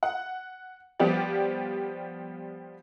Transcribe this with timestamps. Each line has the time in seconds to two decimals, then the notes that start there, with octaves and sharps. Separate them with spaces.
0.03 F#5
1.00 F3 G3 B3 G4 D5